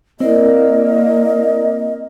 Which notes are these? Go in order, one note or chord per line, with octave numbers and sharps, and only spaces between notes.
A#3 C4 E4 A#4 D5 D#5